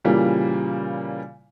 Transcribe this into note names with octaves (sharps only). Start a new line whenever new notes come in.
A#2 C#3 E3 G3 A#3